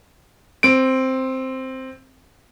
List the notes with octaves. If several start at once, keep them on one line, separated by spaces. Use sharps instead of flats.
C4 D7